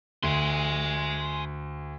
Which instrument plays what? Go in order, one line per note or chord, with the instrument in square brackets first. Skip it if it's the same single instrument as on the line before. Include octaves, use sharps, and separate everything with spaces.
[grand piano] D2 [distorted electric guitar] G#5 C6